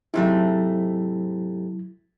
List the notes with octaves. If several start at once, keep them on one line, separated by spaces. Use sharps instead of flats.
G#2 C3 F#3 A3 E4